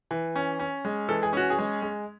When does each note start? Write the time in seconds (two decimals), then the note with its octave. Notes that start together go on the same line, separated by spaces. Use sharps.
0.11 E3
0.36 C#4
0.59 C#4
0.85 G#3
1.09 E3 A4
1.23 G#4
1.33 C#4 F#4
1.50 G#4
1.59 G#3
1.82 G#3